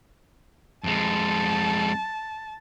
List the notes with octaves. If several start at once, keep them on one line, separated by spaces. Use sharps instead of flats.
F2 G#3 A5